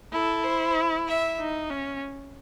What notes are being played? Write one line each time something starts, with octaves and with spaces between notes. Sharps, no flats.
E4 A4
C5
E5
D#4
C#4